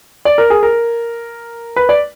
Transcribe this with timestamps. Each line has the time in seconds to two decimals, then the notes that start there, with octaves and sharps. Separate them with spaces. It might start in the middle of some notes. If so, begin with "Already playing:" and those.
0.25 D5
0.38 A#4
0.50 G#4
0.63 A#4
1.76 B4
1.89 D5